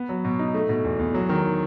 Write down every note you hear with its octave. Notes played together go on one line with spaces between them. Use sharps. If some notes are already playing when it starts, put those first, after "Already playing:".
Already playing: B3
F#3
B2
D#4
A3
B2
E2
E2
F#3
D#3